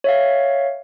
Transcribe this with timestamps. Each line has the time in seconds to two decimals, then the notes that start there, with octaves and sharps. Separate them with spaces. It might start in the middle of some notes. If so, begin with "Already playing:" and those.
0.04 C#5 E5 F5